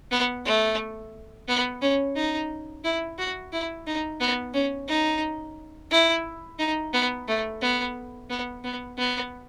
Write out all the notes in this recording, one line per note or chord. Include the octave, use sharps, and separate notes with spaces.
B3
A3
B3
C#4
D#4
E4
F#4
E4
D#4
B3
C#4
D#4
E4
D#4
B3
A3
B3
B3
B3
B3